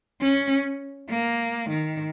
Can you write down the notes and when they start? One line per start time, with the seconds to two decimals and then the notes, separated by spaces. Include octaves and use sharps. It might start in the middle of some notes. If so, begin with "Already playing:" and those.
0.21 C#4
1.10 A#3
1.70 D#3